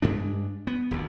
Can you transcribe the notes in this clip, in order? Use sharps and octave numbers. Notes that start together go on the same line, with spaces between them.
G2 G#3 D4
B3
D#1 D2